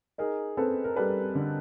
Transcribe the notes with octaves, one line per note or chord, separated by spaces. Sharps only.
D#4 G#4 A#4
C4 A4 B4
A#4
G3 A4 B4
D3